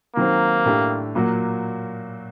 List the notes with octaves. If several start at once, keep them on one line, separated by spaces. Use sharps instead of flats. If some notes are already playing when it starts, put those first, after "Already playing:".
D#3 F#3 A#3 C4
A2 A3 D4 G4
A#2 F#3 A#3 F#4